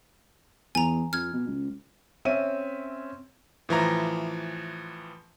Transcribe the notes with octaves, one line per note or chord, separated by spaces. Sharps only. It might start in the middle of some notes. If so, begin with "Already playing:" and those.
E2 G#5 A#5
F2 F6 G#6
B2
C#2
C4 C#4 E5 D#7
A2 E3 F3 A#5